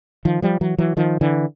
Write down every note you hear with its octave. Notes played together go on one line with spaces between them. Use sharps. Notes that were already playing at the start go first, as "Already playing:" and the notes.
D#3 F3
F3 G3
E3 F#3
E3 F#3
D#3 F3
D3 E3